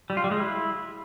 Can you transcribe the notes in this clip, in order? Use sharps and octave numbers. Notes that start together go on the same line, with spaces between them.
G3
F4
G3
G#3
E4